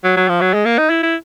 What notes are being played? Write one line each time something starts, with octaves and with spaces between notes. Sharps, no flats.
F#3
F#3
F3
F#3
G#3
A#3
D#4
E4
E4